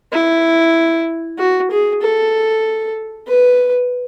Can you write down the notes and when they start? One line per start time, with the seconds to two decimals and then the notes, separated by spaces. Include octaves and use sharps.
0.13 E4
1.39 F#4
1.71 G#4
2.02 A4
3.28 B4